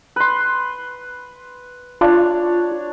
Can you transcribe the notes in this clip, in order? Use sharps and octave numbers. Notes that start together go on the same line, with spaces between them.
B4 C6
D4 F4 C#5